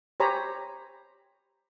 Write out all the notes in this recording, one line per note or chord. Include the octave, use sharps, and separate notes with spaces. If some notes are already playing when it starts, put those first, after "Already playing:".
G4 C5 C#5 G#5 A#5 B5